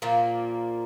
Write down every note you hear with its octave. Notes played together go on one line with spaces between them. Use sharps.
A#2 F3 A#3